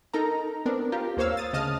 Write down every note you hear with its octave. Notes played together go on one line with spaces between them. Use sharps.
D#4 A4 A#4 A#5
B3 C4 D4 A#4
F4 G4 A#4
D#2 A#3 C5 C#5 F5 E6
D#6 A6
D2 C#3 D#5 A5 D#6 F6